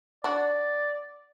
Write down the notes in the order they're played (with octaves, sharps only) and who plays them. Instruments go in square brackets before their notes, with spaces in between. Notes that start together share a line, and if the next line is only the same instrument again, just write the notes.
[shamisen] D4 F#4 [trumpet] D5